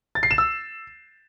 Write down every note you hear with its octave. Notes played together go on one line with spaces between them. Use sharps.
A6
C7
E7
E6